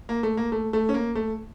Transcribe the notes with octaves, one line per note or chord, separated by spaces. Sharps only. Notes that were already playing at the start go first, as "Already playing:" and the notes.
A#3
A3
A#3
A3
A3
C#4
A#3
A3